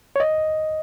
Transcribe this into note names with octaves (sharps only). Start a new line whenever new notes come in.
C#5
D#5